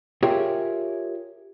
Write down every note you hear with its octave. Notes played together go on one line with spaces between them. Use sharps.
F4 G4 G#4 A#4 C#5 E5